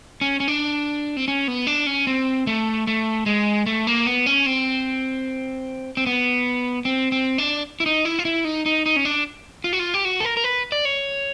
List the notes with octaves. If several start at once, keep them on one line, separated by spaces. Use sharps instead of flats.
C#4
C#4
D4
C4
C#4
B3
D4
C#4
C4
A3
A3
G#3
A3
A#3
B3
C#4
C4
C4
B3
C4
C4
D4
E4
D#4
E4
F4
E4
D#4
D#4
D#4
C#4
D4
F4
F#4
F4
G4
F#4
A4
A#4
A#4
B4
D5
C#5